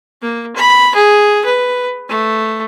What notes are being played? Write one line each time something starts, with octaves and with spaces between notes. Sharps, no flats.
A#3
B5
G#4
B4
A3